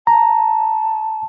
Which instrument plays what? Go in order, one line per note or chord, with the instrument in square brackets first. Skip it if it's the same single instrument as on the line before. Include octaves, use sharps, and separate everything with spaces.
[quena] A5 [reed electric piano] A#5